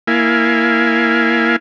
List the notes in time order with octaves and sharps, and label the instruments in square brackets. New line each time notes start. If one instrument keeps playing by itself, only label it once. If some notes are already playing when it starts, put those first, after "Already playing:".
[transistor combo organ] A#3 E4 F5 G#5